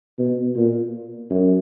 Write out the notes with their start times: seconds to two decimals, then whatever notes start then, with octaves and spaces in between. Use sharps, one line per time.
0.19 B2
0.56 A#2
1.30 F#2